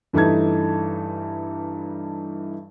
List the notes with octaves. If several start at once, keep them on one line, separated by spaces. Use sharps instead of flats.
G2 E3 A3 D#4 A5 G#6